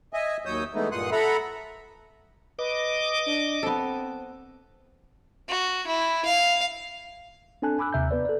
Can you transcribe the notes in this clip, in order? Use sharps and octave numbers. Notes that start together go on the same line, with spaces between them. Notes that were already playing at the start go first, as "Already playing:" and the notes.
D#5 E5 G#5
D#2 F#3 C#5 D#6 E6 G6
E3 G#3 A3 B3 D#4 E4
G2 A#2 F#5 C6 D#6 F#6
A4 E5 F#5 A#5 B5
B4 D#5 D6
D4
B3 C4 A4
F#4
E4
F5
C4 D4 A4 G#5 A5 F#6
G#5 B5 D6 E6 F#6
D#2 C3 E5 A#5 G6
B3 B4 D5
A4 D5